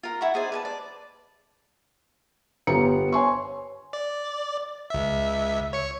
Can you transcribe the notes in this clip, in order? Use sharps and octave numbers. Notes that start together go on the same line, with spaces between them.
F4 A#4
E4 F#5 B5 C#6
D#4 G#4 C5 D5
B4 G#5 A5
D5
G1 B3 F4 G4 A#5 C#7
C#5 G#5 C6 C#6
D5
C#2 E5
C#5 C#7